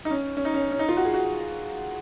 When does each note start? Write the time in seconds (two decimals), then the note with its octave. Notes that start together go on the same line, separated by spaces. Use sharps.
0.05 D#4
0.11 C#4
0.37 C#4
0.45 D#4
0.54 C#4
0.71 C#4
0.79 D#4
0.89 F4
0.97 F#4
1.05 G#4
1.14 F#4